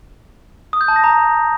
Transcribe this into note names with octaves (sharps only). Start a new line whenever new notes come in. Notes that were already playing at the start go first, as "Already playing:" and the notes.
D#6
G6
A5
A#6
A#5